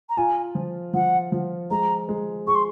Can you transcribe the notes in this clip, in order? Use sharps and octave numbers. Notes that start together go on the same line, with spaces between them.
A#5
F4 G#5
F3
F3 F#5
F3
G#3 A#5
G#3
G#4 C#6
C6